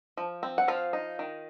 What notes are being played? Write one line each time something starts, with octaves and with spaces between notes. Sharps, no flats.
F3
C4
F#5
F3 F4 F5
D#4
D#3